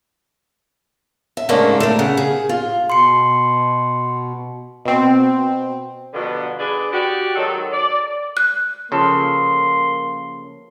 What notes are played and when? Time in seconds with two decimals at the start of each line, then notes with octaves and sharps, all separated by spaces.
1.37 E5
1.49 G#2 C#3 A3 A#3 C4 D4
1.80 A3 A#4
1.99 C#3 F#5
2.17 G#4
2.49 F4
2.90 B2 C6 C#7
4.85 B2 C4
6.14 B2 D3 F3 G3 A#3 B3
6.59 D4 G#4 B4 D5
6.92 F#4 G4 D5
7.35 D#3 F#3 G#3 A4
7.72 D5
8.37 F#6
8.92 C#3 F3 A#3 A4 C6